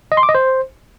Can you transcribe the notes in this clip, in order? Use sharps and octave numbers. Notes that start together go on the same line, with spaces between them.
D#5
C6
D6
D#5
C5